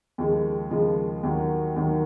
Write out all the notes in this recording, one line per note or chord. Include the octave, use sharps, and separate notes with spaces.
D#2 C#3 F3 G#3
D#2 C#3 F3 G#3
D#2 D#3 F#3
D#2 D#3 F#3